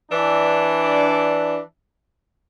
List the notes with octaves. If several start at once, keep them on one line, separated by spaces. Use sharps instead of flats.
E3 D4